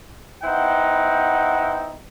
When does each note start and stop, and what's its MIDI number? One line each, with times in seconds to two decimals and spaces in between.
0.43 1.96 59
0.43 1.96 63
0.43 1.96 64
0.43 1.96 72
0.43 1.96 78
0.43 1.96 79